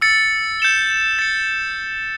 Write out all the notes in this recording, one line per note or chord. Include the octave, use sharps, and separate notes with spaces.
E6 A6 C#7
G6 C#7 E7 G7
A6 C#7